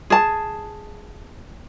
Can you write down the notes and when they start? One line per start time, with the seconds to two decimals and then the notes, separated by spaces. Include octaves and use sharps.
0.10 G#4 A5